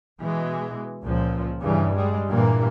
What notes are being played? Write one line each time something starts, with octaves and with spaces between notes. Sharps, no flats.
B2 E3 G#3
C#2 A#2 F3
G2 C#3 E3
G3 G#3
G2 A#2 E3 A#3